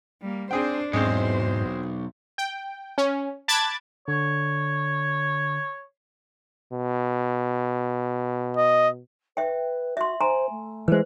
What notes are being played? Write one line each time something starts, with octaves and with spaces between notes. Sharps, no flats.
G3 A#3
C4 D4 G#4 C5 G5
B1 E2 G#2 G#3 C4 C5
G5
C#4
A5 B5 D6 F#6 G#6 A6
D3 C#5
B2
D#5
B4 E5 G5
F#4 E5 C6
C5 G#5 A#5 C6
A3
E3 G#3 B4 C5